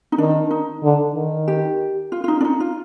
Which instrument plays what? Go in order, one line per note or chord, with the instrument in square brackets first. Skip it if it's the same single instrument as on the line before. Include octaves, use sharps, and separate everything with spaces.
[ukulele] D#4
[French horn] D#3 [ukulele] D4
[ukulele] D#4
[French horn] D3
D#3
[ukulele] G4
F4
F4
D#4
D4
D#4
F4